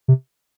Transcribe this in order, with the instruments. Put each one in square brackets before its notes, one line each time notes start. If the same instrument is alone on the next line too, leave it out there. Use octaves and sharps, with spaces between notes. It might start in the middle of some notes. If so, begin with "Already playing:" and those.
[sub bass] C3